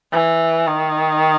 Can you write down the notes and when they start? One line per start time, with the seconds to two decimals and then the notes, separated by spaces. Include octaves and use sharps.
0.13 E3
0.67 D#3